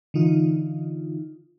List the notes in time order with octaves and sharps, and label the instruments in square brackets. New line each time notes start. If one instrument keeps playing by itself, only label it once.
[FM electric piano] D3 E3 D#4 F4